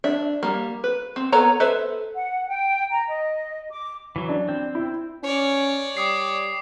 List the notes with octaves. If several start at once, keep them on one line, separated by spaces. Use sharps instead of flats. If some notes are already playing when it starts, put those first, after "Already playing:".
D4 E5
G3 A#3
B4
C4
B3 A4 A#4 C#5 A#5
A4 B4 C5 E5
F#5
G5
A#5
D#5
D6
E3 F#3
D4
C4
E4
C#4 C#5 D5
G3 D6 D#6 C7